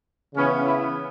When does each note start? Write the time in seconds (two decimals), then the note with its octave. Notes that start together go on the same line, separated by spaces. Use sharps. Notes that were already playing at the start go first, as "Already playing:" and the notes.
0.34 C#3 E3 B3 C#4
0.64 E4